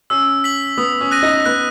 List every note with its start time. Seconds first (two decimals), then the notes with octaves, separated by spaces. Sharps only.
0.10 C#4 E6
0.44 B6 F#7
0.77 B3 D#6
1.01 C#4
1.11 F#6 A#6 D#7
1.22 D#4
1.46 B3 F#6